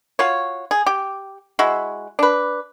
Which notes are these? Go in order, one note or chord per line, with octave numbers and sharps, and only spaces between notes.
F4 F#4 C#5
G#4
G4
G#3 E4 F#4
D4 B4